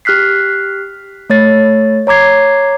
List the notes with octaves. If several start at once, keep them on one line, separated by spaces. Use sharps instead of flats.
G4 F6 F#6 B6 C7
A3 C#5 A6
C#5 A#5 D6 G#6 C7